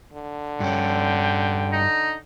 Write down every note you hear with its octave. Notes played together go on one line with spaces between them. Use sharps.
D3
G2 C#4 G5
D#4